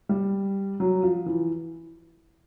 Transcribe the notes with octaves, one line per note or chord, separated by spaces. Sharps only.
G3
F#3
F3
E3